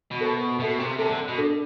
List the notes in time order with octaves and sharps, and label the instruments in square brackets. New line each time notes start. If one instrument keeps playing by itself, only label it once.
[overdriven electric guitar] B2
[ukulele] A4 C5 E5 A5
[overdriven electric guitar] B2 [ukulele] A4 E5 A5
[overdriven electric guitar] C3
[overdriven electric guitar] C3 [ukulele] A4 E5 A5
[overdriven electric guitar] D3
B2
[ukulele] D4 A4 D5